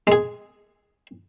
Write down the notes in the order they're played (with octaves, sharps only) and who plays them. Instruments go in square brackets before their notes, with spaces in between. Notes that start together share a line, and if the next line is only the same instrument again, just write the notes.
[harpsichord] G#3 G#4